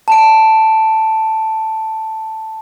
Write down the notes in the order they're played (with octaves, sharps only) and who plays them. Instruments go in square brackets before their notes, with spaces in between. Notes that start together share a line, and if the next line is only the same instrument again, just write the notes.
[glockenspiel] A5 D7